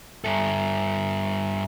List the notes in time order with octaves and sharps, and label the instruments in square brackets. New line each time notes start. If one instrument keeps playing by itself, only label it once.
[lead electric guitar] G2 A4 [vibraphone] E5 G#5 A#5